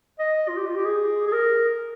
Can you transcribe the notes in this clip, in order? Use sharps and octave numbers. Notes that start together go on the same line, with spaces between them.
D#5
F4
G4
F4
G4
G#4
G#4
A#4